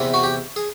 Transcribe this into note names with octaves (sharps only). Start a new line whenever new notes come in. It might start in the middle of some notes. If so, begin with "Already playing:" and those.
Already playing: E2 C3 E3
F#4
G4
G#4